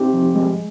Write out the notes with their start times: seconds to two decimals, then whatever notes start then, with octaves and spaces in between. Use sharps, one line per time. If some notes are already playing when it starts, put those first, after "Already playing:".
Already playing: C4 D#4 G4
0.14 F3
0.35 G#3